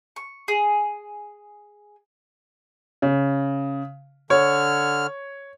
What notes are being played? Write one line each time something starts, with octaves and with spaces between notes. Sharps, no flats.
C#6
G#4
C#3
D3 C#5 F6